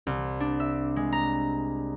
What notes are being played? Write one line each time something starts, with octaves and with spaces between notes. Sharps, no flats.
C2
D4
E5
G#3
A#5